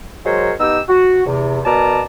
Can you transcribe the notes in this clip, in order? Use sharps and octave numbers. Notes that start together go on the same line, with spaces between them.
F#3 G#3 A#4 C5 C#5
B3 D#4 G4 E6
F#4
E2 C3
B2 A#4 D5 A5 A#5